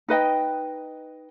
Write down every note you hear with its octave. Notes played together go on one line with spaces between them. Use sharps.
D#4 B4 D#5 G5